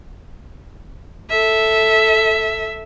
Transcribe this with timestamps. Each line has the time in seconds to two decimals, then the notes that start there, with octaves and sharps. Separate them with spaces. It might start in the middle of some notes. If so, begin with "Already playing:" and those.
1.30 A4 E5